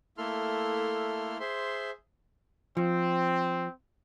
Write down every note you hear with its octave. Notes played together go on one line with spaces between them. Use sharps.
A3 A#3 E4 A4 C6 F6
G#4 C5 E5 C6
F3 C4